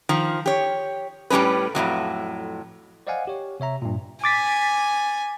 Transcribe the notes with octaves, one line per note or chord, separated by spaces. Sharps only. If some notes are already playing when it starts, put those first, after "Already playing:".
D#3 F3
G4 C#5
A2 G3 B3 C#4 B4
F2 A2 C3 F#3
C5 D5 D#5 F5 F#5 G#5
G4 C#5
C3 C#5 E5 A#5
G2 A#2
G#5 D6 A6 B6